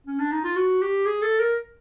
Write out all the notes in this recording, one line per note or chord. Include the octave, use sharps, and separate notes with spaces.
C#4
D4
D#4
F4
F#4
G4
G#4
A4
A#4